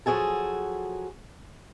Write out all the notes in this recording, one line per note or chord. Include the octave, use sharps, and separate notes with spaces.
F3 F#3 F#4 G#4 A4